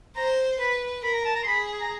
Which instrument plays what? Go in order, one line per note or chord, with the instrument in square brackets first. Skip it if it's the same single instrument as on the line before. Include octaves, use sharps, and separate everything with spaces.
[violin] C5 [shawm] A#5
[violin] B4 [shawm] B5
[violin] A#4 [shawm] B5
[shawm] A#5
A5
A#5
C6
[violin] G#4 [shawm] B5
[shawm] A#5